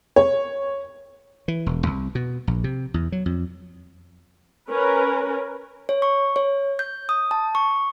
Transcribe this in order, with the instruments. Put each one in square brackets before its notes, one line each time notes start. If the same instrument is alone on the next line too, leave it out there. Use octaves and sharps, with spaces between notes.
[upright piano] C#5
[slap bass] E3
E1
C2
B2
A#1
C3
E2
F#3
F2
[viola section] C#4 A#4 B4
[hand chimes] C#5
C#6
C#5
G6
D#6
A5
C#6